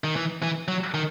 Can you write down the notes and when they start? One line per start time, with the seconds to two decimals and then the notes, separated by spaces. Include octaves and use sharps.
0.04 D#3
0.16 E3
0.43 E3
0.68 F#3
0.94 D#3